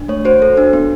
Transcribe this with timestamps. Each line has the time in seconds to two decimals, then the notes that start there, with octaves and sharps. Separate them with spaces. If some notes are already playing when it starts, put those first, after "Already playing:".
Already playing: D4
0.08 A3 C#5
0.25 F#4 C5
0.42 A4
0.57 D4
0.73 B3